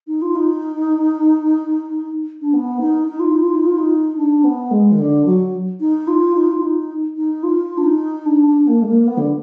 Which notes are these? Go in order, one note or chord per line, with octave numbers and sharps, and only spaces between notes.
D#4
F4
D#4
D4
B3
D#4
D#4
F4
D#4
F4
D#4
F4
D#4
D4
B3
G#3
D#3
D3
F#3
D#4
F4
D#4
F4
D#4
D#4
F4
D4
D#4
D4
D4
A#3
G#3
A#3
B3
D3